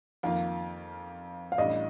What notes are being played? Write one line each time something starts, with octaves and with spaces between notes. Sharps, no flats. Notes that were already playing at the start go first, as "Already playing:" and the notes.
F2 D#3 A#3 F4 F5
F5
A1 A2 G3 D4 D#5